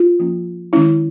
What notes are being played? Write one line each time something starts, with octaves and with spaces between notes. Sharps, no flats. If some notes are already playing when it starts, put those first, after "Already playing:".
Already playing: F4
F3 A#3 C#4
D#3 G#3 C#4 E4